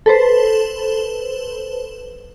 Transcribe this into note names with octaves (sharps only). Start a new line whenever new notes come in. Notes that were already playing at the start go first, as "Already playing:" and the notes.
A4 B4 C5